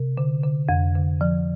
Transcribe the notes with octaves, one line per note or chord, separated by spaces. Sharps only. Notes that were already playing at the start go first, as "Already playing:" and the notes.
Already playing: C3
D3
D3
F2
D3
F3